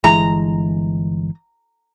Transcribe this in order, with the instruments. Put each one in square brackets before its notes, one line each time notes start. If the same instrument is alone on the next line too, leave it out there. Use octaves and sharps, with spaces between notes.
[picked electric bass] G1 E3 G#3 [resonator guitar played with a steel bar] A#5